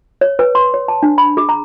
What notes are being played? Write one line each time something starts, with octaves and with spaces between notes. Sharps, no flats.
C#5
B4
C6
C#5
A5
D4
B5
G#4
A#5